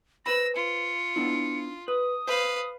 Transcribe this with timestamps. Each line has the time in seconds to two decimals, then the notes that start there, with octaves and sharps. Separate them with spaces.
0.26 B4 C5 B5 E6 A#6
0.56 F4 C#7
1.16 B3 D4 E4
1.88 B4 D#6
2.27 B4 C5 F5